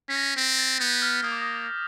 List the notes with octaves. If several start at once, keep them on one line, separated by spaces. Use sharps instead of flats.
C#4 B6
A#6
B6
C4 A#6
A#6
A6
B3 G6
F6
A#3 D#6
D6
D#6